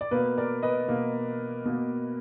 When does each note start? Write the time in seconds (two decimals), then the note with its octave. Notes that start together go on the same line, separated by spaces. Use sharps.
0.01 D5
0.11 B2 A#3 B4
0.37 A#4 D5
0.62 B4 D#5
0.88 B2 A#3
1.65 B2 A#3